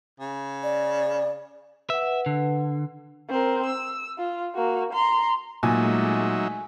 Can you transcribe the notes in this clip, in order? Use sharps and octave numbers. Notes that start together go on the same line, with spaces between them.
C#3
D5
B4 E5 F#5
D3
C4 A#4
E6
F4
A#3 F#4
A#5 C6
A#2 F#3 G#3 A3 D#4 E5 G#5